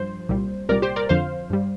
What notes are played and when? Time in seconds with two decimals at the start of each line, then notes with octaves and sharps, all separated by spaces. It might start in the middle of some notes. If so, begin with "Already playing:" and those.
Already playing: G2 F3 C5
0.29 C2 A#2 G3
0.69 C2 A#2 G3 A#4 D5
0.82 G4 C5
0.96 A#4 D5
1.09 F2 D3 F3 C5 F5
1.50 G2 G3